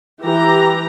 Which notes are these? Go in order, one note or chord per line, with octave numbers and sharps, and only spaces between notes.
E3 G4 A#5